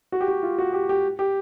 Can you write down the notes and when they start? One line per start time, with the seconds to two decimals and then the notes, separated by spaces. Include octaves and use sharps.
0.12 F#4
0.21 G4
0.28 F#4
0.43 F4
0.58 F#4
0.73 G4
0.89 G4
1.19 G4